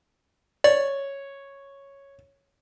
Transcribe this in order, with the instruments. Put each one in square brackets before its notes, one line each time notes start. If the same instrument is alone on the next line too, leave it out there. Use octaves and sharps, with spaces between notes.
[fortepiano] C#5 [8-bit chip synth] D5